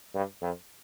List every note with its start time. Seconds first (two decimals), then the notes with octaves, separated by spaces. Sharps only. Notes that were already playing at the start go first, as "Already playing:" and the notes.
0.14 G2
0.42 F2